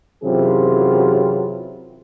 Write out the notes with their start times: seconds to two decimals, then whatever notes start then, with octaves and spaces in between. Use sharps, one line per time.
0.24 F#2 C3 E3 F#3 F4 G#4